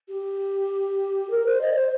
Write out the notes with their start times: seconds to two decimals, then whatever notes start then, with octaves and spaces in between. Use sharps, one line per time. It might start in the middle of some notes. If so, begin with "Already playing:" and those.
0.09 G4
1.30 A#4
1.46 C5
1.61 D#5
1.72 D5
1.76 C5